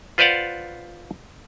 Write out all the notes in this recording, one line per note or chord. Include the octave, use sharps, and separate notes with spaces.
F4 B4 C5 D5 F5 F#5